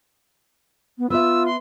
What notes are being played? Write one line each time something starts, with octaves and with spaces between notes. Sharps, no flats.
B3
B3 F4 B4 E5 E6
C6